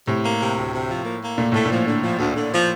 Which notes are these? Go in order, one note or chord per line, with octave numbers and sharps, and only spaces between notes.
A2 C3
A#3
C3
D2
C3
F3
A#3
A#3
A#2 A3
A2 A3
A#2
F3
D3
F3
D2
D3
F3